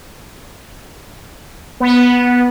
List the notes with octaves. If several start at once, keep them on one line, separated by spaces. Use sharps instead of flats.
B3